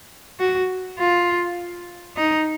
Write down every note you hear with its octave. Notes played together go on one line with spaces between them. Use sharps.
F#4
F4
D#4